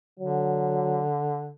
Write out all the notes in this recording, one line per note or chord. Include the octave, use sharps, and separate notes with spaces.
D3 F#3